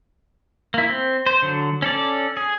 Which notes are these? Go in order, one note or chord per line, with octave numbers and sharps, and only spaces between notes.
A#3 E4
C4
C5
D3 F#3
C#4 A4 D5
G#4